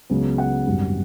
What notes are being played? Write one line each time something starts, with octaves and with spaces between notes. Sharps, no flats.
C#2 C#3 F#3 B3
F#5
G#1 F#2 D#3 G3